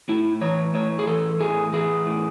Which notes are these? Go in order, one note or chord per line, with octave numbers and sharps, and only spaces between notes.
A2 E4
E3 C#5
A2 C#5
G#4
E3 A4
A2 G#4
E3 G#4
A2